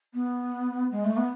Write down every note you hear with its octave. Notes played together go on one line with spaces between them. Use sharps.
B3
G#3
A3
B3